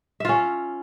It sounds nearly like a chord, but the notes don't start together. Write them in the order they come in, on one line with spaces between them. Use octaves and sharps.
E5 F4 C#4